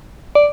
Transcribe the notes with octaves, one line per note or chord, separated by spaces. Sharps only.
D5